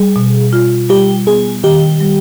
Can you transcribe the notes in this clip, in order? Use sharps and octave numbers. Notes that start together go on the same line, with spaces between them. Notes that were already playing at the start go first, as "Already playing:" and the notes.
Already playing: G3 G#4
B2
F4
G3 G4
B3 G#4
D#3 G4
G3